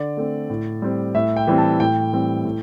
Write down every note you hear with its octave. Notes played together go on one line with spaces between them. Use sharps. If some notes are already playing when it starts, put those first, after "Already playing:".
Already playing: D3 D5
A3 C4
A2
G3 C4
A2 E5
G5
E3 G3 C4
A5
A2 G5
E3 G3 C4
A2